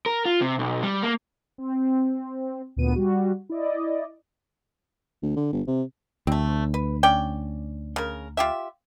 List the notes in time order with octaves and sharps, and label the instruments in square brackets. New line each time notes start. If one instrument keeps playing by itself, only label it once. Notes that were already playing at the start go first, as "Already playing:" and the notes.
[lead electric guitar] A#4
F4
C3
B1
G3
A#3
[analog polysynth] C4
D2 A#2 B3 D#7
G3 F#4
E4 D5 D#5
[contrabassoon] D2
D3
G1
C3
[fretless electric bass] D2 [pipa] A3 C4
[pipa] B4
C#4 D5 G5
C#3 A#4
F4 G4 E5